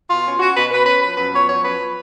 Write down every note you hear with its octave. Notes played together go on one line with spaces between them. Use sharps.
B2 F4
C#4
C#4 F#4
B2 B4
B2 B4
C#4 B4
F3 B4
F#2 B4
B3 C#5
F3 C#5
F#2 B4